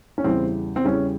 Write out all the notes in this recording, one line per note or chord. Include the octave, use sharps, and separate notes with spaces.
C#4
E2 C#3 E3 G3 C4
C4
E2 C#3 E3 G3 C#4